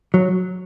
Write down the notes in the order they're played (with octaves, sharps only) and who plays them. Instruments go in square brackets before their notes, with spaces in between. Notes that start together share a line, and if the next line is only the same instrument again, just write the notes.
[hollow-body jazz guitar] F#3